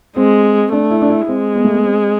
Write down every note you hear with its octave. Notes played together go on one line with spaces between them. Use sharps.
G#3 C4
A3 D4
E4
D4
E4
G#3 C4
B3
A3
B3
C4